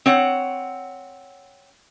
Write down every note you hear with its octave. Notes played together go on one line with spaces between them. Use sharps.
C4 C#5 F#5